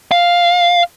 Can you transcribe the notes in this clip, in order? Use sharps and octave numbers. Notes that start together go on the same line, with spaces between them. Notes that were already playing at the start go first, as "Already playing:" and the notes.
F5